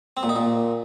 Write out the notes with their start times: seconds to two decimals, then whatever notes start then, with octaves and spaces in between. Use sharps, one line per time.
0.17 C4
0.23 A#2
0.29 D#4
0.36 A#2